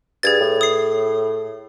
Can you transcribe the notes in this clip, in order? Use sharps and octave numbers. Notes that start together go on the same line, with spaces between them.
G2 G#4 G#6 A6
A2
D#6 C7